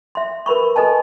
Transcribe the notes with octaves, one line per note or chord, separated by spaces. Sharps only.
E5 C6
A#4 B4 B5 C#6
A4 B4 D#5 G#5 A5